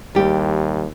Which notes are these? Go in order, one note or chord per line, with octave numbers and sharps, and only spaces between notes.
D#2 G3 G4